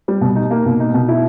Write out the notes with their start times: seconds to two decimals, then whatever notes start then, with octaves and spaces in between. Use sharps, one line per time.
0.08 G3
0.21 B2
0.36 D#4
0.51 A#3
0.66 B2
0.80 D#4
0.94 B2
1.08 E4